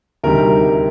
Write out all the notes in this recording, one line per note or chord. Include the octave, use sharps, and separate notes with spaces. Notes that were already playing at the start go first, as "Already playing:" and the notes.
D2 C3 D#3 G3 A#4